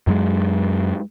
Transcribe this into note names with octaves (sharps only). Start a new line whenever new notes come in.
F#2 F#3 G#3